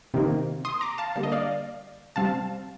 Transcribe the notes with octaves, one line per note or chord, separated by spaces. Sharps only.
C3 D#3 A#3
C6 D#6
A#5 D6
F5 A5
D3 G3 A#3 F5
D#5
D5 F5
C3 G3 C4 F5 A5